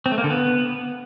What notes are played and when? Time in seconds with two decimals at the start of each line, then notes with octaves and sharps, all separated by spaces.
0.06 C4
0.12 A3
0.18 A#3
0.24 D3
0.30 B3